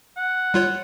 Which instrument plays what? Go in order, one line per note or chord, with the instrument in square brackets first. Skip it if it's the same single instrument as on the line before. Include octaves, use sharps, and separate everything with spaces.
[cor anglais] F#5
[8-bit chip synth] G3 F4 C#5